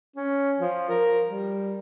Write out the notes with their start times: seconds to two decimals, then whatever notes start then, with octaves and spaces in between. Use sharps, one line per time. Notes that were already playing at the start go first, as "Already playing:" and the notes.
0.16 C#4
0.60 F3
0.89 A#4
1.28 G3